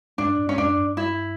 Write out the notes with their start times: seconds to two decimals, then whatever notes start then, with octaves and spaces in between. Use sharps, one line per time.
0.18 G2 D4
0.38 G2
0.49 C#4
0.57 F#2 D4
0.78 G2
0.97 E4